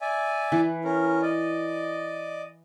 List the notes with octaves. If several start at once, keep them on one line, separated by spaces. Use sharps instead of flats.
D5 E5 G#5
E3 B4
C#4 A#4
D5 D#5